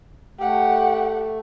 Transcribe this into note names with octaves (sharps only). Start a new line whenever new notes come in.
A3 G4 F#5